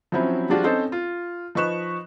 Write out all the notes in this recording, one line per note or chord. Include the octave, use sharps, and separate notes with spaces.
F3 F#3 C4 C#4 E4
F3 G3 G#3 D4 F4 F#4
C4 C#4 D#4 A4 C5
F4
F3 D#4 B4 C#6 F#6 E7